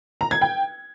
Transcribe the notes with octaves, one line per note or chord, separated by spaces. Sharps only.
A#5
G#6
G5